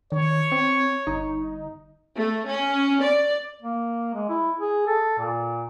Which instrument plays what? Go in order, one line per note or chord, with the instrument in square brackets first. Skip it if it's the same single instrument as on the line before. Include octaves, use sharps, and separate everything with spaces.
[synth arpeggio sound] D#3 [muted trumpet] C#5
[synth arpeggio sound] C4
G1 D#4
[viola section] A3
C#4
D5
[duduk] A#3
G#3
E4
G#4
A4
A#2